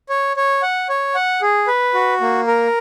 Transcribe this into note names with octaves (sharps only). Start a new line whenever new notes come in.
C#5
C#5
F#5
C#5
F#5
G#4
B4
F#4
A#3
A#4